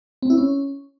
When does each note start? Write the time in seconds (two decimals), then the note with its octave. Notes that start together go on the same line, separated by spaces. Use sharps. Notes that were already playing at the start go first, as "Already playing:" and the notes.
0.23 C4
0.30 E4
0.38 C#4